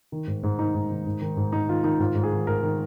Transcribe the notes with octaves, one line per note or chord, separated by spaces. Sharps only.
D#3
G#2
G#2
D#3 D#4
G#2
D#3
G#2
D#3
G#2
G#2 D#4
D#3 F4
D#3 D#4
G#2 F4
G#2
G#4
D#3
G#2 A#4
D#3